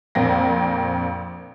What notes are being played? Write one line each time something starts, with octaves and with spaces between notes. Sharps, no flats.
A#1 F2 A#3 C4 G5 A#6